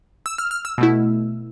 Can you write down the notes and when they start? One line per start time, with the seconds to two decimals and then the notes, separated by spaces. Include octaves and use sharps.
0.26 E6
0.38 F6
0.51 F6
0.65 E6
0.78 B2 A3 E4